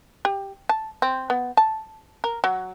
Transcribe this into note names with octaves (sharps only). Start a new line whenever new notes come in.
G4
A5
C4
B3
A5
A#4
F#3